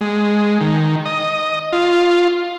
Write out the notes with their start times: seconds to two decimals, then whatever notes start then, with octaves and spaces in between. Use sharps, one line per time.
0.01 G#3
0.61 D#3
1.05 D#5
1.73 F4